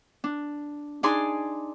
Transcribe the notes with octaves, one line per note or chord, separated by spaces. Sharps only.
D4
D4 D#4 G#4 D5 G#5 C6